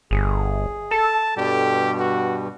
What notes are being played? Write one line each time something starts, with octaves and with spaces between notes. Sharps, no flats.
G1 G#4
A4 A5
G2 B2 G3 G4
F#4